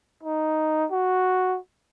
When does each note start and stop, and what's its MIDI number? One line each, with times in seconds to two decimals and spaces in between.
0.23 0.86 63
0.91 1.58 66